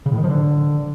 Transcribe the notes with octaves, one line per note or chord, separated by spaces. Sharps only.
C#3
A2
D#3
F3
D3